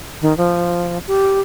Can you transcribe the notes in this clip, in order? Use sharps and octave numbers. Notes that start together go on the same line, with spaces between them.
D#3
F3
G4